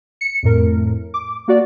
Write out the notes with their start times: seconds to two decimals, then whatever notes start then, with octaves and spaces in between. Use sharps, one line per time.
0.21 C#7
0.43 F2 A2 A#4
1.14 D6
1.48 A#3 F#4 D5